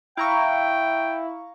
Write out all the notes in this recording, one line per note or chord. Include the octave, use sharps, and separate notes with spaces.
E4 F5 G5 A#5 C#6